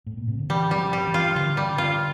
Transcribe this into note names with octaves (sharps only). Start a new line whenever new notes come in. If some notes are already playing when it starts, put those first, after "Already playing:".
A2
A#2
C3
D3
E3 G3
G3
F3
G3
E3
F4
D3 F4
G3
F4